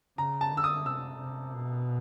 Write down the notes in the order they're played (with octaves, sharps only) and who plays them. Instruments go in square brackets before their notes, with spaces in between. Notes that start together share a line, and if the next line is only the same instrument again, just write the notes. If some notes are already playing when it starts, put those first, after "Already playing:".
[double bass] C#3 [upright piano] A#5
[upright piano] A5
[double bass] D3
[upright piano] E6
D#6
[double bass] C3 [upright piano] E6
[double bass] C3
B2